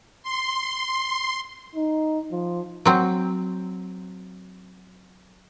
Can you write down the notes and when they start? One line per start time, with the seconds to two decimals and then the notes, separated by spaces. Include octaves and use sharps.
0.23 C6
1.75 D#4
2.31 F3
2.85 F#3 C4